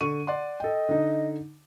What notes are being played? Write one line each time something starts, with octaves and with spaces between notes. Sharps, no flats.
D3 C#6 D#7
D5 F#5 C6
A4 D#5 G5
D3 D#4